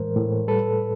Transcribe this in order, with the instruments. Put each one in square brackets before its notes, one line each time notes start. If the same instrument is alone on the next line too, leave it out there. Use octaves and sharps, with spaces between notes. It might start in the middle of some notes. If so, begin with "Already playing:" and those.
Already playing: [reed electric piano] A2 E3 G#3 A#4 C5
A2
G3 A4 B4